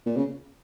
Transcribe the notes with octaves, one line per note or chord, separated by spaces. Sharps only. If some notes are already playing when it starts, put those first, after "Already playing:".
A#2
C#3